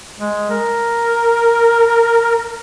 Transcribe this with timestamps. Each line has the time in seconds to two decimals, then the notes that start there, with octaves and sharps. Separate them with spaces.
0.19 G#3
0.50 A#4